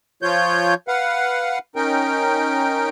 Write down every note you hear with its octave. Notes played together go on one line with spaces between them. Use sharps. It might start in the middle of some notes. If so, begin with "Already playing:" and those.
F3 F4 C#5 G6
B4 F5 F#5
C#4 D#4 A#4 G5